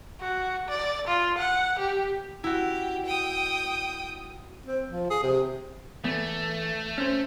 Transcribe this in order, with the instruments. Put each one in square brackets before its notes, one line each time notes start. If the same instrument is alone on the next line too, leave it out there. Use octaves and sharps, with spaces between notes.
[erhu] F#4
D5
F4
F#5
G4
[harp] E4 F#4 [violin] G4
[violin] G5 D#6
[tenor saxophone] C4
F3
G#4
C3
[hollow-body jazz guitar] E2 B3 [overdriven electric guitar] A3
[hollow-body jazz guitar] C#4 C5